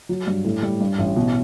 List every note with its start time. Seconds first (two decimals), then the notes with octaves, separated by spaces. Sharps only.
0.09 F#3
0.27 G2
0.45 A2
0.62 G3
0.81 G2
0.98 A1
1.16 B2